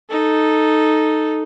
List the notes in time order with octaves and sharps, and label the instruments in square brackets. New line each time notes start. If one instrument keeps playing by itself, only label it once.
[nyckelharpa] D#4 A4